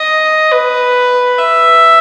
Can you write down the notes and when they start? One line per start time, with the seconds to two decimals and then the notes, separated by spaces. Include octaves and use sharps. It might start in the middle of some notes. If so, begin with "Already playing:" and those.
Already playing: D#5
0.52 B4
1.38 E5